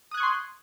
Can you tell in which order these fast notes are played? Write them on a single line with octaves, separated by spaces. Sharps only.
D#6 F#6 G#6 C#6 C6